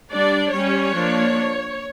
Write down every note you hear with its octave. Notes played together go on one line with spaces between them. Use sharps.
G3 D4 D5
G3 C#4 C#5
F3 A#3 D4